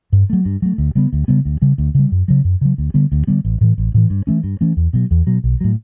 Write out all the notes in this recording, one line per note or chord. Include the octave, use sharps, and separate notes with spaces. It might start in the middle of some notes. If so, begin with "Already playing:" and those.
G2
F#3 A3
G2
F#3 A3
D2
C#3 G3 B3
D2
C#3 G3 B3
D2
C#3 G3
D2
C#3 G3
F#2
C#3 F#3
F#2
C#3 F#3
D2
D3 G3 B3
D2
D3 G3 B3
A1
A2 E3
A1
A2 E3
G2
E3 A3 C#4
G2
E3 A3 C#4
E2
B2 F#3
E2
B2 F#3
B1
A2 F#3